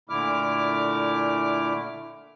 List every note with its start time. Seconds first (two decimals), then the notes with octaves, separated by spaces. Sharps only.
0.09 A#2 D3 A3 E4 D6 F6